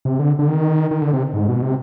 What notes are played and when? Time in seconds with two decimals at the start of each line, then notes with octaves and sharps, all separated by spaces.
0.05 C3
0.19 D3
0.39 D3
0.48 D#3
0.91 D#3
1.02 D3
1.13 C3
1.34 G#2
1.49 B2
1.62 C3